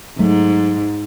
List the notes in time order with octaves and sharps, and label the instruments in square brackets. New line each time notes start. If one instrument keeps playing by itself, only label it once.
[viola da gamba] G#2 [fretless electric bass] F#3 A3